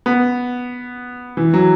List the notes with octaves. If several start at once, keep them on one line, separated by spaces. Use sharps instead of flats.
B3
E3
F#3